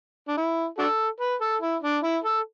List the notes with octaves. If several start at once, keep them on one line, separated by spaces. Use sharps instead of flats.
D4
E4
D4 F#4 A4
B4
A4
E4
D4
E4
A4